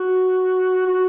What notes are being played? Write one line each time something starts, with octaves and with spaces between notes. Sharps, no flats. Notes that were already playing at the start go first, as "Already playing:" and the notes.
Already playing: F#4
F#4